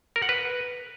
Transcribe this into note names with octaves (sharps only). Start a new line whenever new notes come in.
A#4
F#5
B4